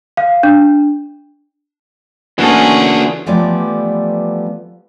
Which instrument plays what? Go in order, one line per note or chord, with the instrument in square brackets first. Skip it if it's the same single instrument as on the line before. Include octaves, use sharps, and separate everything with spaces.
[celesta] F5
D4
[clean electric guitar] E3 A#3 A4 [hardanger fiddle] C#4 G#4 [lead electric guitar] D4 F#4
[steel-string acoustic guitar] E3 F3 G3 A3 B3 D5